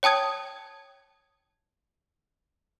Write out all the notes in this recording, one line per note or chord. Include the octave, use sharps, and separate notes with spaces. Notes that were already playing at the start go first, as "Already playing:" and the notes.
C#5 G5 A5 D#6 G#6